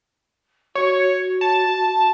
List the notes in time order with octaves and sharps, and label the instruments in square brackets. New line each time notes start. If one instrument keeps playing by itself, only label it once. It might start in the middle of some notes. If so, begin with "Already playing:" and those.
[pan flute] F#4 [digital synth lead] C#5
[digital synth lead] A5